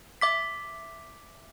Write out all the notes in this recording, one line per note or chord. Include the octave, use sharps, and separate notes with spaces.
E5 D6 B6